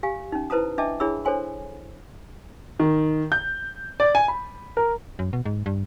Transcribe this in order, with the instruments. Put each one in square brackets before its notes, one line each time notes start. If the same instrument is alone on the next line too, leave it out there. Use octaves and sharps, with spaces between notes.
[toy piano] G4 F5 G#5
C#4 D#4
E4 B4 C5 A5 A#5 D#6
D4 D#5 E5 G5 A5 D6
D4 E4 G#4 C#5 B5 E6
D4 A4 C5 C#5 G#5 C6
[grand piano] D#3
G6
D5
G#5
B5
A#4
[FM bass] F#2
B2
G#2
G2